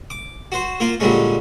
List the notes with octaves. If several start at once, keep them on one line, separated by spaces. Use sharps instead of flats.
D6
F#4 C5
A#3 F4 C5
A#2 D3 G3 G#3 C#4